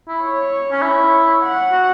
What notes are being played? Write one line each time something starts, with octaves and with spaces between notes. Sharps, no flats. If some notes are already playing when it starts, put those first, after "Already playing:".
E4
C#5
C#4
E4
F#5
F#4